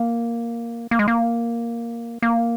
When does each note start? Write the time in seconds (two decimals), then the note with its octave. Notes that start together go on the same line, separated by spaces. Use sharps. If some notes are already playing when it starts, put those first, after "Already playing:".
Already playing: A#3
0.91 A#3
0.99 G#3
1.08 A#3
2.22 A#3